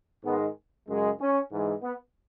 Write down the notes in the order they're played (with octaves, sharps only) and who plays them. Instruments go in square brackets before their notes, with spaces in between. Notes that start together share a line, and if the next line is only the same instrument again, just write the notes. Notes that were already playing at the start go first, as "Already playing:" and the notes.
[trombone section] G#2 D#3 G#3 B3
F#2 C#3 G#3
C#4
G#2 E3 G#3
B3